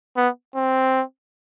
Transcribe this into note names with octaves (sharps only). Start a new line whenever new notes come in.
B3
C4